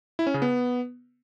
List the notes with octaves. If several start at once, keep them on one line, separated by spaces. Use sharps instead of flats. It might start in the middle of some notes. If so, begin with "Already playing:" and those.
E4
C#4
C#3
B3